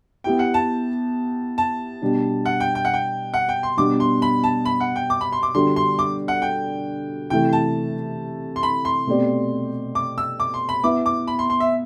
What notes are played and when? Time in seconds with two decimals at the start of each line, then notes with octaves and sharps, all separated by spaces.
0.24 B3 E4 G4 G5
0.39 F#5
0.54 A5
1.58 A5
2.02 B2 G3 D4
2.46 F#5
2.60 G5
2.75 G5
2.85 F#5
2.94 G5
3.34 F#5
3.49 G5
3.63 C6
3.77 B2 G3 B3 D4 D6
4.00 C6
4.22 B5
4.44 A5
4.65 B5
4.80 F#5
4.96 G5
5.10 D6
5.21 B5
5.33 C6
5.43 D6
5.54 D3 G3 D4 F#4 C6
5.76 C6
5.99 D6
6.28 F#5
6.42 G5
7.30 C3 E3 A3 E4 G5
7.53 A5
8.56 C6
8.63 B5
8.85 C6
9.07 B2 A3 C4 G4 D5
9.95 D6
10.18 E6
10.40 D6
10.54 C6
10.69 B5
10.84 B3 E4 B4 E5 D6
11.06 D6
11.28 B5
11.39 C6
11.50 C6
11.60 E5